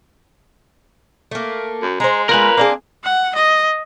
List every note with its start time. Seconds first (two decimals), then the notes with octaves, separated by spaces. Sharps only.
1.31 A3 A#3
1.82 F#2
2.00 G#3 C5 A#5
2.29 A#2 G#3 A#3 B3 A#4 B4
2.57 A#3 C4 D4 G#4
3.04 F#5
3.35 D#5